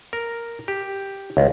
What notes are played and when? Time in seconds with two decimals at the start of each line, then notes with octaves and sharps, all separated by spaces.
0.13 A#4
0.68 G4
1.37 C#2